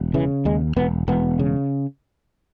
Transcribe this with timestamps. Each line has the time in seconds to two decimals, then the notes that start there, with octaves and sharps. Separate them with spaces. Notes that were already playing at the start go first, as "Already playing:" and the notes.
Already playing: E1
0.14 C#3 E3
0.45 D#2 G#3
0.76 E1 B3
1.08 E1 B3
1.39 C#3